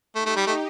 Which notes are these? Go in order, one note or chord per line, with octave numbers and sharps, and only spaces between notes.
A3 D#4 G4
A3
G3
A3